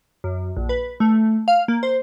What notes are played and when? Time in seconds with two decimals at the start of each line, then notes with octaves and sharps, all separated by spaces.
0.24 F#2
0.57 A#1
0.69 B4
1.00 A3
1.48 F5
1.68 A#3
1.83 C5